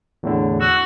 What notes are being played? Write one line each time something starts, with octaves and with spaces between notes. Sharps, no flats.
E2 A2 D3
F#4 E6